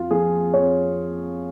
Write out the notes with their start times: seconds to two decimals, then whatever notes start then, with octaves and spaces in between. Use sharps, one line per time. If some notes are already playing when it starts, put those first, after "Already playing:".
Already playing: F2 F4
0.11 F3 G#4
0.54 F2 C#5